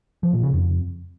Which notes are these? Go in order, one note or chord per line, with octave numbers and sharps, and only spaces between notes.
F3
A#2
C#3
F2